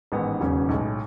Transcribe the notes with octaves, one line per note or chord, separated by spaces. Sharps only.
A1 G#2 D#3 G#3 B3
E1 D#2 C#3 F#3 C#4
B1 A2 G#3